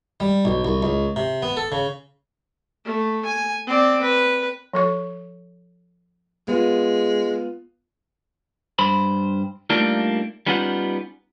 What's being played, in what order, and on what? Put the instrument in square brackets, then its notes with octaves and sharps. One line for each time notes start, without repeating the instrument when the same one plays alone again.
[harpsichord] G3
B1
C2
C#2
C3
B3
A4
C#3
[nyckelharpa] A3
G#5
C4 D5
B4
[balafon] F3 A4 C#6
[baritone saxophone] G#3 [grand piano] B3 F4
[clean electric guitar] G2 C5 B5
G3 A3 A#3 D4 D#4 F4
G3 B3 C#4 D#4 F4 F#5